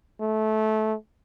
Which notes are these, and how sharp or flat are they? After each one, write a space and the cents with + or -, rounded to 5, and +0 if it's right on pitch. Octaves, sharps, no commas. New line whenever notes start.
A3 -20